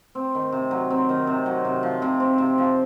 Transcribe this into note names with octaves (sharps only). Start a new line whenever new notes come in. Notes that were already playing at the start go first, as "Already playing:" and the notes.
C4
D#3
C3
F#3
C4
D#3
C3
F#3
C3
F3
C3
C4
C3
F3